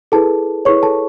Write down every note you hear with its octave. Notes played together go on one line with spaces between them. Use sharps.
E4 G#4 A4 B4 A5
E4 G#4 B4 C#5 C#6
A4 A5